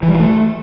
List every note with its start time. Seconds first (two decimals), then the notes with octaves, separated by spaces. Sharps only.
0.03 E3
0.08 G3
0.14 E3
0.20 A3